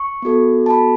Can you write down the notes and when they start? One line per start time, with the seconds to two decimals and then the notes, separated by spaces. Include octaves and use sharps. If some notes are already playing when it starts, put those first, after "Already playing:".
Already playing: C#6
0.22 B3 F#4 A4
0.66 A5
0.70 B3 F#4 A4 B5